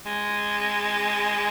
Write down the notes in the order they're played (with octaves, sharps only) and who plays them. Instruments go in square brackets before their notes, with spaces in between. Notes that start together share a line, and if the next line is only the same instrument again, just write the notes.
[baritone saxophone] G#3